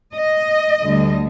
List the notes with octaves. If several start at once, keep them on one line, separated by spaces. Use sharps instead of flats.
D#5
D2 D3 G3